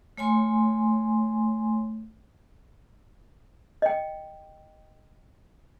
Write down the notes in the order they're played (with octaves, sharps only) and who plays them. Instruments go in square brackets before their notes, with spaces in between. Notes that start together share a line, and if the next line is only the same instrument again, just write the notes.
[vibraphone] A3 C#5 G#5 C6
[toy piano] D#5 G5